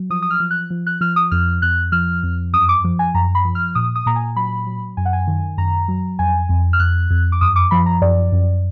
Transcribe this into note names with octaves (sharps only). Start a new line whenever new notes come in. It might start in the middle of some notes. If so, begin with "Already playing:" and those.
Already playing: F#3
F3 D#6
D#6
F6
F3
F#6
F3
F#6
F3 F6
D#6
F2 F6
F2 F#6
F3 F6
F2
F#2 D#6
D6
F3
G#5
F#2 A#5
B5
F3
F6
A#2 D#6
D#6
A#2 A#5
G#5
F#3 B5
F#3
F#2 G#5
F#5
G#5
D#3
F#2 A#5
F#3
F2 G#5
F2
F6
F2 F#6
F2
D6
F#2 D#6
D6
F3 B5
A#5
F#2 D5
F#2